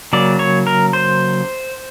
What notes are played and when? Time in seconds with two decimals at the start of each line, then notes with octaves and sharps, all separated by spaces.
0.13 C#3 F#3 A#3 D5
0.39 C#5
0.67 A#4
0.93 C5